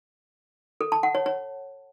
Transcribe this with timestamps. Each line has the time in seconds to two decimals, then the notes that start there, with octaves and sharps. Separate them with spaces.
0.81 A4
0.92 A5
1.03 F#5
1.15 C#5
1.26 C#5